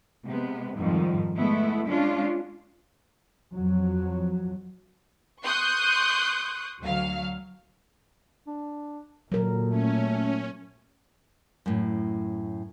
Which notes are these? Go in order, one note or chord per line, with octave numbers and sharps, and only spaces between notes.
C3 G#3 B3
F2 G#2 D#3 F3 G3
G#3 A3 B3 E4
G#3 C#4 D4 F4
F2 F#3
C6 C#6 D#6 F#6 G6
D2 F#3 F5
D4
A#2 D3 F#3 A#4
A3 C#4
F#2 A2